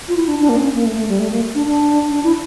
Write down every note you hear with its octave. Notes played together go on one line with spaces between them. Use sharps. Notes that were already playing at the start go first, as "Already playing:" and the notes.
F4
E4
D4
D4
A#3
C#4
A#3
A3
A3
G3
A3
A#3
D4
D4
D4
E4